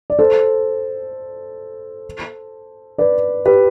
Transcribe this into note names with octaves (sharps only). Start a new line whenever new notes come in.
D5
A4 C5
B4 D5
G4 B4